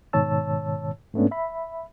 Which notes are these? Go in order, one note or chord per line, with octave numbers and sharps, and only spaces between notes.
G#2 B2 D#3 C#5 A5 E6
G#2 A3 B3 C#4 D4
E5 B5